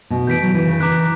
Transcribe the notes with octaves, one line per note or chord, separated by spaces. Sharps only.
B2
E3 G6 B6 D7
F#3
E3
C#3
E3 A#5 D6 F#6 B6